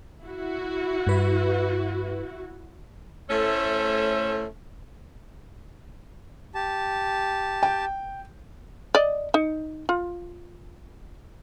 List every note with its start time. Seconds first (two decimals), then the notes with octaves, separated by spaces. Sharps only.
0.22 E4 F#4
1.07 G2 B4
3.30 A2 A3 C#4 A4 C5 E5
6.55 G4 A5
7.63 G5
8.95 D5 D#5
9.34 D#4
9.89 F4